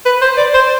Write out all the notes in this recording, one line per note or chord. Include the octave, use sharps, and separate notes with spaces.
B4
C5
D5
C5